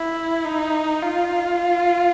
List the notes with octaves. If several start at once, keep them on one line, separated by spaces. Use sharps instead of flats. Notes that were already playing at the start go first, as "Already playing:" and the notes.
Already playing: E4
D#4
F4